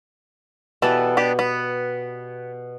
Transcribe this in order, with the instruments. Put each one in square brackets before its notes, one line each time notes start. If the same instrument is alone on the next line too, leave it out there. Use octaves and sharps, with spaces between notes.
[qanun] B2 G3 B4 [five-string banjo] E3 A4
[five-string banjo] B3 D4 G4
B3